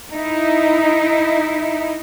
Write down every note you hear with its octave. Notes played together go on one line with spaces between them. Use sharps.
D#4 E4